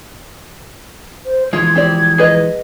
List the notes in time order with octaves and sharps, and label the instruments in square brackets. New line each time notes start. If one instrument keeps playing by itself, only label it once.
[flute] C5
[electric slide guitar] E3 F3 G#3 [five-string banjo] F4 [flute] G#6
[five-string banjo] C4 G4 D5
G#4 B4 D#5